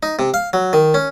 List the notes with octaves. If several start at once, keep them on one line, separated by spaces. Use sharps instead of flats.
D#4
C3
F5
F#3
D#3
C#4